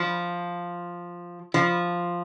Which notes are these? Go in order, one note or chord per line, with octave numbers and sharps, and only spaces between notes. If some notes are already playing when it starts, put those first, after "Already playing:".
Already playing: F3
F3